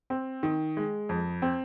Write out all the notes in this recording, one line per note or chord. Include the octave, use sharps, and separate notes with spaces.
C4
D#3
G#3
F2
C4